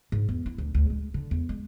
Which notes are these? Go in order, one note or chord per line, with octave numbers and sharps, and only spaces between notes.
G#2
E2
E4
D2
D2
G#3
D3
E2
G#3